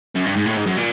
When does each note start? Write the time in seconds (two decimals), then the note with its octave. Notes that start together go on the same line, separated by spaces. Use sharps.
0.16 F#2
0.26 G2
0.36 G#2
0.46 A2
0.57 G#2
0.66 F#2
0.77 A#2